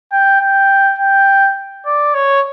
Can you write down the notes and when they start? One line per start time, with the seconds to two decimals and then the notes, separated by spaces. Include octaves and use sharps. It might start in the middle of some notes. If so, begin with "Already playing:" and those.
0.12 G5
0.41 G5
0.98 G5
1.86 D5
2.14 C#5